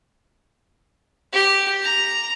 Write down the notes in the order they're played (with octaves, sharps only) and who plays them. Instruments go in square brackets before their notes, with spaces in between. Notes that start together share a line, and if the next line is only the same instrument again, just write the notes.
[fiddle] G4
A#5